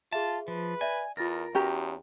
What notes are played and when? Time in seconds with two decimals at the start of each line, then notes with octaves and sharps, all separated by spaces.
0.13 F4 G#4 E5 A5
0.48 F3 B4
0.81 D5 E5 G#5
1.17 E2 F4 A#4 A6 A#6
1.55 E2 C#4 F#4 G4 A#5